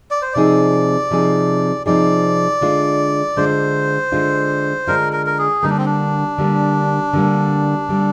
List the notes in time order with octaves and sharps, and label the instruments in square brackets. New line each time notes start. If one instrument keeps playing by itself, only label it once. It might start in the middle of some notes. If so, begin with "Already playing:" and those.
[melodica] D5
C5
[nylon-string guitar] C3 F3 C4 D#4 G#4 [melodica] D5
[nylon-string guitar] C3 F3 C4 D#4 G#4
[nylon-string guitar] C3 F3 C4 D#4 G#4 [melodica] D5
[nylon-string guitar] D3 G#3 D4 F4
[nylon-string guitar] D3 G#3 D4 F4 [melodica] C5
[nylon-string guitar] D3 G#3 D4 F4
[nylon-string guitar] D3 G#3 D4 F4 [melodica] A#4
[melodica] A#4
A#4
G#4
[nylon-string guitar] D3 G3 A#3 [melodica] D#4
[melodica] D4
C4
D4
[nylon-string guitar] D3 G3 A#3
D3 G3 A#3
D3 G3 A#3